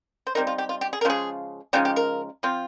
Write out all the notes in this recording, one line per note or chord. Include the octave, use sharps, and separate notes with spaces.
C5
G3 C4 D#4 A#4
F4
G4
F4
G4
G#4
A#4
C#3 F3 G#3 G#4
C#3 F3 G#3 D#4 G4
G4
A#4
F3 C4 F4